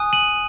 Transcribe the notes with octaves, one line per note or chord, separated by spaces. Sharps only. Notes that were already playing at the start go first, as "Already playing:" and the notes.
Already playing: G#5 D#6 F#6
D#7 F#7